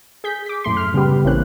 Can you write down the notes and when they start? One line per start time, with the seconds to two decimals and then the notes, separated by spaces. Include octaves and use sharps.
0.24 G#4 G6 B6
0.46 D6 B6
0.64 F#2 A2 A3 C6
0.77 F6
0.94 C#3 G3 B3 G4 B4
1.24 A1 E3 A#3 C4 C#4 F#6